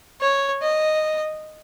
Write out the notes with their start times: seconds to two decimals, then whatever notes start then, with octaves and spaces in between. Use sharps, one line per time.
0.21 C#5
0.62 D#5